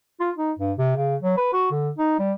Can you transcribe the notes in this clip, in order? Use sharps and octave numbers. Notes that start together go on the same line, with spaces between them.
F4
D#4
G2
C3
C#3
F#3
B4
F#4
D3
D#4
G3